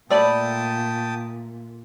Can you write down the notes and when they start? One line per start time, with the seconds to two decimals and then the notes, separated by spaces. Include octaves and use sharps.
0.10 A#2 A3 D5 G5 A5 B5 D#6